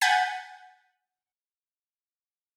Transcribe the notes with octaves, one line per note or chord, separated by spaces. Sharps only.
F#5 G#5 G6 A6 B6 D#7